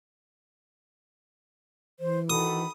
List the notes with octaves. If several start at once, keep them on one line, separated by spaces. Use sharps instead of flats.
E3 C5
D#3 F#4 A4 B5 D#6